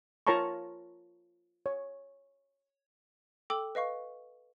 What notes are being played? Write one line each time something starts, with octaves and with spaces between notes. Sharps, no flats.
F4 A#4 C#5 A5 A#5 C#6
C#5
A4 G5 D6 E6 F#7
B4 D#5 F5 C#6